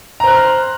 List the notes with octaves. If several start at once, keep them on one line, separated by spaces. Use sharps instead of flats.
C5 A#5 C6 F6 F#6